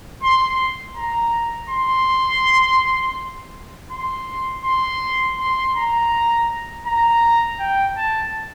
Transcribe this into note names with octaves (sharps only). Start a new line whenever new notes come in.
C6
A#5
C6
C6
C6
C6
A#5
A#5
G5
A5